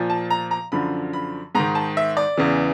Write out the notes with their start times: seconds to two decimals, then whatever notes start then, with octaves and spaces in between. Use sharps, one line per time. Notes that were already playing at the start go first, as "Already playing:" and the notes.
Already playing: A#2 F3
0.10 A5
0.30 A#5
0.51 A#5
0.72 F#2 D3 F3 B5
1.13 B5
1.55 G#2 D#3 A#5
1.75 A5
1.97 E5
2.17 D5
2.37 E2 C#3 E3